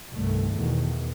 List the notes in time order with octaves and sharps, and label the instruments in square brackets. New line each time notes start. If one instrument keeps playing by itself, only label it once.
[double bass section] C2 G2 D#3 A3
E2 B2 D#3